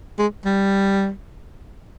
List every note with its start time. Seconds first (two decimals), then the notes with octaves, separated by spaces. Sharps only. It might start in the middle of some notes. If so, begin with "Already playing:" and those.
0.19 G#3
0.45 G3